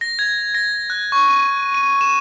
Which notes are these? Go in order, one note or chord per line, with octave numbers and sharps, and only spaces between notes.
A#6
G#6
A#6
F#6
C#6
D#7
D#7
E7